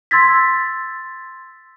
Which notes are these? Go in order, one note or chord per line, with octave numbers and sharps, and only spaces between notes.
C6 E6 G#6 A6 B6